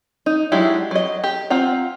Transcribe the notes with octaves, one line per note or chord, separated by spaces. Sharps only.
D#4
F#3 G#3 D4 E4 G4
F#3 D#5
G4
C4 F4 F#5 A#5